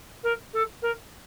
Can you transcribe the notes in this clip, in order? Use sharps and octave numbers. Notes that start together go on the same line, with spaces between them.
A#4
A4
A#4